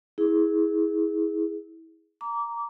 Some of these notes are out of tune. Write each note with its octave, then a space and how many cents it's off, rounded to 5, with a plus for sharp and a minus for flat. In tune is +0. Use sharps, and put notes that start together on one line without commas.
E4 -25 G#4 +0
A#5 +0 D6 -25